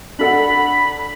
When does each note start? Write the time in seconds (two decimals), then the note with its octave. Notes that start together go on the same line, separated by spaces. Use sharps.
0.19 D4 A4 F#5 B5